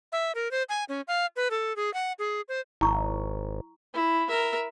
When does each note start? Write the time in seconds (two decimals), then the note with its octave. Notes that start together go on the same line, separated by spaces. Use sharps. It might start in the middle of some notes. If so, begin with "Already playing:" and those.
0.12 E5
0.35 A#4
0.51 C5
0.69 G#5
0.89 C#4
1.08 F5
1.36 B4
1.51 A4
1.76 G#4
1.94 F#5
2.19 G#4
2.48 C5
2.81 G#1 E4 A#5 C#6
3.94 E4
4.28 A#4 E5